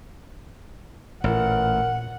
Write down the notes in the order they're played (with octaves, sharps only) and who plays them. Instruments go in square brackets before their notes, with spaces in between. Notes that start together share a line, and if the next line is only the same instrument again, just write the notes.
[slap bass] A1 [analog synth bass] A#2 [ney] A#4 [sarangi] F#5